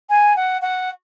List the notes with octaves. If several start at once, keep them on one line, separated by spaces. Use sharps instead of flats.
G#5
F#5
F#5